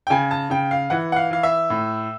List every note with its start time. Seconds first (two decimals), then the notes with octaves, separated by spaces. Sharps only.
0.07 G5
0.10 C#3 G#5
0.31 A5
0.50 C#3 G5
0.71 F5
0.90 E3 F#5
1.12 F#5
1.16 F5
1.31 E3 F5
1.43 E5
1.70 A2